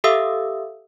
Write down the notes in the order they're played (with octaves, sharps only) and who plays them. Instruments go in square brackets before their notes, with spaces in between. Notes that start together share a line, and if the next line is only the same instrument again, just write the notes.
[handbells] G4 A4 E5 F5 D#6 E6